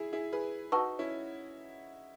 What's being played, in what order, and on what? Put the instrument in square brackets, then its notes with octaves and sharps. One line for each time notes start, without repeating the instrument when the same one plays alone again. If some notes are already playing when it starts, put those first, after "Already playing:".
Already playing: [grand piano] E4 G#4
E4 G#4
G#4 B4
[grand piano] D#4 F#4 [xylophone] B4 F#5 A5 C#6 E6
[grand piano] C#4 E4